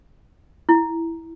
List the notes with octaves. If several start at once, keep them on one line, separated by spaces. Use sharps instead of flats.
E4